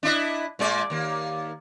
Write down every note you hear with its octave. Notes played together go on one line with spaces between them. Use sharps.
D4 E4 D#5
A#2 G#3 D5
D#2 A#3